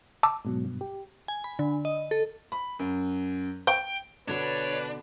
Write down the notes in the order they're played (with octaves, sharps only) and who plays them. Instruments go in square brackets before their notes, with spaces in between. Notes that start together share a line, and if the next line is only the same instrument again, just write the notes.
[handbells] A5 D6 E6
[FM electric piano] G#2 B2 F#3
G2 B2
G4
[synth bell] G#5
B5
D3
D#5
A4
[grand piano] B5
F#2
G5
[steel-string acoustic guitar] B2 D3 [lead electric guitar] D4 [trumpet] B4 [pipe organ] C#5